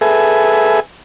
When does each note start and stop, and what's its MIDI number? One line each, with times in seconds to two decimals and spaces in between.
0.01 0.80 68
0.01 0.80 69
0.01 0.80 71
0.01 0.80 76
0.01 0.80 80